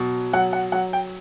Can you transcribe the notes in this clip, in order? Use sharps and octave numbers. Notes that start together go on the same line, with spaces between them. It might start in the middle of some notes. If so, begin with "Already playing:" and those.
Already playing: B2 F#3
F#3 F#5
F#5
F#3 F#5
G5